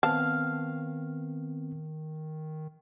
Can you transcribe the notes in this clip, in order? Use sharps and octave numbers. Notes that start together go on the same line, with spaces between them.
D#3 B3 C4 F5 A5 F6